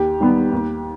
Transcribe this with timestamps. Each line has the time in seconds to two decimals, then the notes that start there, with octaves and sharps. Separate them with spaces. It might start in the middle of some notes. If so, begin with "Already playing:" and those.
Already playing: D#2 G4
0.20 D#3 G3 B3
0.52 D#2